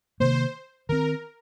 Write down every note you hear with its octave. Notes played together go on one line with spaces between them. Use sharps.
C3 D#3 A#3 C5
D#3 C4 A#4